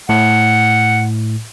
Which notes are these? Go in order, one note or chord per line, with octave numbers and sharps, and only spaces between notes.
A2 F#5